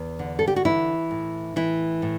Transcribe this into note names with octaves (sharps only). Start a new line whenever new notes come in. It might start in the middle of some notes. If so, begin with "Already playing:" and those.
Already playing: E2
D3
A4
G4
F#4
E3 E4
A2
E3 E4
A2